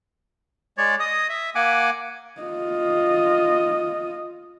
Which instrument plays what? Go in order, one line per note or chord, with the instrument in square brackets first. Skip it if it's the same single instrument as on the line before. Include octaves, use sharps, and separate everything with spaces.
[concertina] G#3 C#5 D5
D#5 D#6
E5
A#3 F#5 G#5 D6
[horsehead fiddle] F4 D#5